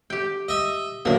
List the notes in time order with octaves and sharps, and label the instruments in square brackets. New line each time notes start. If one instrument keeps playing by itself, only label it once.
[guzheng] G4 G5
[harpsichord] D#5 E5
[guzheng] A2 D3 [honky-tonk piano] F#3 B3 E5 [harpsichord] A#3